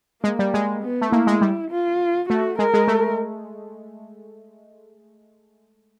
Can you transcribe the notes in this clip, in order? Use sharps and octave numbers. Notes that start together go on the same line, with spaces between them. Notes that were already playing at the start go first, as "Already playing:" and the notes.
G#3 A#3
G3
G#3
B3
A3
A#3 E4
G#3
G3
F4
A3 F#4
G#3 A#4
G#3
A3